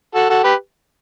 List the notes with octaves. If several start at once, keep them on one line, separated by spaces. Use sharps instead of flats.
F#4 A4
F#4 A4
G4 B4